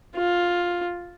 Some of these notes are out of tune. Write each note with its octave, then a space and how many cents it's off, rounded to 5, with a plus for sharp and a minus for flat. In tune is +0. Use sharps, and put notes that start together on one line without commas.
F4 +10